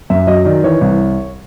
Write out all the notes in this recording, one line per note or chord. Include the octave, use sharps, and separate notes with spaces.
F#2 E5
F#3 D#5
D#3 D5
E3 C#5
C2